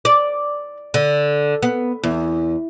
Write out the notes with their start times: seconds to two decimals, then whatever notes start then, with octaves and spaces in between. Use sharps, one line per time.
0.05 D5
0.94 D3
1.63 B3
2.04 E2